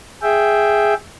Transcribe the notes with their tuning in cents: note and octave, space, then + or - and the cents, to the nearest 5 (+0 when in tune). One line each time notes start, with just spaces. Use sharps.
G#4 +0 E5 +0 G5 +0